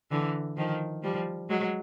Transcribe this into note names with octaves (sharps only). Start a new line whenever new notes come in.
D3 E3
D#3 F3
F3 G3
F#3 G#3